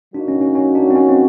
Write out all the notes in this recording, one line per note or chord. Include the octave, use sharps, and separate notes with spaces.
F#3 A#3 D4 D#4 F#4
C#4
C#4
C#4
D4
C4
C#4
C4